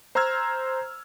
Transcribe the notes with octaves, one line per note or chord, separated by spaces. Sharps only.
C5 A#5 C6 E6 F6 G#6